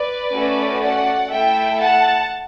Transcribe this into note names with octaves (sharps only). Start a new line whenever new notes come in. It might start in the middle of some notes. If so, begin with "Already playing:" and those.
Already playing: B4 D5
A3 C#4 F#4 A4
D5 F#5
A3 E4 A4 E5 G5
F#5 A5